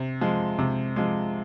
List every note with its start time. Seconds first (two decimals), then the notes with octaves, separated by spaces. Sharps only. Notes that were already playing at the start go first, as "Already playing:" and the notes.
Already playing: C3
0.21 F3 G#3
0.59 C3
0.96 F3 G#3